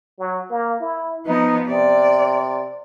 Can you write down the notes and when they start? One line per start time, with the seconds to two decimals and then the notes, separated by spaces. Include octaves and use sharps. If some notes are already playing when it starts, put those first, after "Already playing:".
0.19 F#3
0.50 A#3
0.80 E4
1.26 F3 B3 D#4
1.68 C3 D5